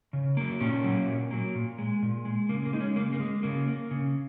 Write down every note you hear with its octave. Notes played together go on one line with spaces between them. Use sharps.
C#3
F#3 A#3
A#2 C#4
F#3 A#3
A#2
F#3 A#3
A#2
G#3
A#2
G#3
C#3 A#3
A#3
G#3 D#4
C#4
C#3 A#3
A#3
G#3
C#3 A#3
A#3
C#3